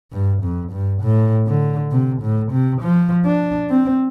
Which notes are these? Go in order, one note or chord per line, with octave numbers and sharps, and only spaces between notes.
G2
F2
G2
A2
D3
C3
A2
C3
F3
D4
C4